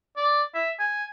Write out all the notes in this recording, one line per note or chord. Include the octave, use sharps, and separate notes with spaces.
D5
E5
G#5